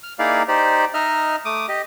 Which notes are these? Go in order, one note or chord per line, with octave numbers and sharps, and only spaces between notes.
F6
A#3 D#4 E4 G#4 D5 F5
D#4 G4 C5 D5
D#4 D#5 E5 F6
A3 D6 D#6
G4 D#5